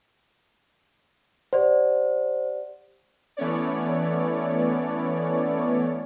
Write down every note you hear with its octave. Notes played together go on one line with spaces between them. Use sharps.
G4 C5 D5 F#5
E3 A3 B3 C#4 C#5 D5